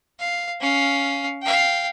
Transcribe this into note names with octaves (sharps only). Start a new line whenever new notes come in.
F5
C#4 F5
F5 G5